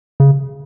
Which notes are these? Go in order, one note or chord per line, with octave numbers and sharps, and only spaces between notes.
C#3